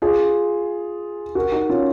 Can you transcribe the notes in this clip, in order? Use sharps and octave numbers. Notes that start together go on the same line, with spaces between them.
F4 G#4
F#4 A#4
D#4 F#4
C#4 F4